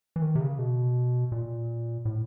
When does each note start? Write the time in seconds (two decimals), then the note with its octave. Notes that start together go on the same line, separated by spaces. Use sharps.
0.16 E3
0.22 D#3
0.35 C3
0.41 C#3
0.59 B2
1.32 A#2
2.05 A2